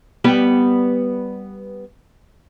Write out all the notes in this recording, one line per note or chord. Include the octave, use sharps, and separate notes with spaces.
G3 B3 G4